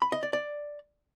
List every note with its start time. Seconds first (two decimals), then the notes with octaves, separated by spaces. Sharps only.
0.02 B5
0.12 D#5
0.23 D5
0.33 D5